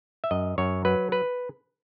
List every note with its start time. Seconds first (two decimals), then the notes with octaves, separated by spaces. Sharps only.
0.24 E5
0.31 F#2 D#5
0.58 F#2 C#5
0.85 F#3 B4
1.12 B4